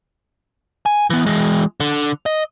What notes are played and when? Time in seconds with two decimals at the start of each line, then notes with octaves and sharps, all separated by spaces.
0.86 G#5
1.10 E3 B3
1.26 E3 G#3
1.80 D3
2.26 D#5